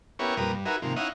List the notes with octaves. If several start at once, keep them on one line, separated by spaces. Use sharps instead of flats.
B3 C#4 E4 G4 A#4 C#5
F2 A#2 G3 A#4 B4 D#6
G2
D#4 F#4 G#4 A#4 B4 E5
G#2 C3 D#3 F3 A#3
C#4 D#4 E4 D#5 F5 F#5